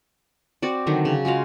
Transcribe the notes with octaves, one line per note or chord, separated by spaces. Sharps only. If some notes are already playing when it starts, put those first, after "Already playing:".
C4 F#4 D5
D3 D#3 F#3 D4
C#3
G#3 F4 F#4 F5